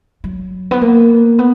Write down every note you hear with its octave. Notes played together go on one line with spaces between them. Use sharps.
F#3
B3
A#3
B3